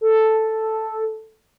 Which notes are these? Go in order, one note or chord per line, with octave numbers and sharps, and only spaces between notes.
A4